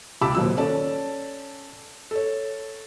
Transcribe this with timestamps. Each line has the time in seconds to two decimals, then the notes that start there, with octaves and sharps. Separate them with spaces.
0.21 C#2 G4 A5 B5 D6 E6
0.35 D#1 D#2 F#3 E6
0.57 C#4 A4 D5 A5
2.11 A4 C#5